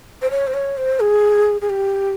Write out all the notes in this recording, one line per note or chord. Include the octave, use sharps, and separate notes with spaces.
C5
C#5
C5
C#5
C5
G#4
G#4
G4